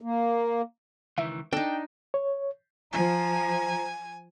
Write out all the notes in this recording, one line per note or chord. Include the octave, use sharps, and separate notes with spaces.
A#3
C#2 D#3 E3 E5
D4 D#4 A4 G5
C#5
F3 G#5 A#5